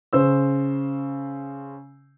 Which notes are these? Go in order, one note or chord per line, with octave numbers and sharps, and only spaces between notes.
C#3 C5 E6